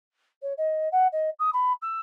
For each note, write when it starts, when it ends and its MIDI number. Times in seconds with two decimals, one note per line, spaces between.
0.42 0.53 73
0.57 0.88 75
0.92 1.07 78
1.12 1.29 75
1.39 1.50 87
1.53 1.72 83
1.81 2.00 88